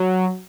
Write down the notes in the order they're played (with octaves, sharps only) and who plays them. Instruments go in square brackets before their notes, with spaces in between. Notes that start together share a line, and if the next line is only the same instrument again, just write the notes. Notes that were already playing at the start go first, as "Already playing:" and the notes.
Already playing: [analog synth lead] F#3